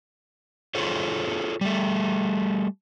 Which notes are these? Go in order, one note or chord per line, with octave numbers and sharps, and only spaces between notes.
F4 G#4 A4 C5 C#5
G3 A3